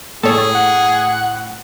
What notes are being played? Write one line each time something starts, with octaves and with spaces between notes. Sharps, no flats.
A2 G#4 A4 C#5
F#5